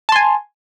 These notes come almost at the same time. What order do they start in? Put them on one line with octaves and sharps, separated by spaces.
A5 C6 G#5